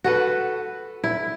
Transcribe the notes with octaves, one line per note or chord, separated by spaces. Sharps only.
F#4 A4 B4
E4